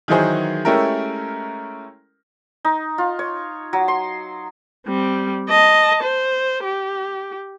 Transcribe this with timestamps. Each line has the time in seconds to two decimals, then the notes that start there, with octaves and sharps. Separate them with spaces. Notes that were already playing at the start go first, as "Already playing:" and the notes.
0.08 D#3 E3 F#3 D#4 G#4 C5
0.65 G#3 A3 C#4 E4 G4 A#4
2.65 D#4
2.98 F4
3.19 C#5
3.73 F#3
3.88 C6
4.87 G3 C4
5.49 D#5 A5
6.04 C5
6.64 G4